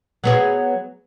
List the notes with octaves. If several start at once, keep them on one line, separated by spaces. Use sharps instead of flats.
F#3 B3 G#4